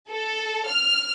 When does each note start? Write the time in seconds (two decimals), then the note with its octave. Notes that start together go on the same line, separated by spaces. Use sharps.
0.11 A4
0.69 F6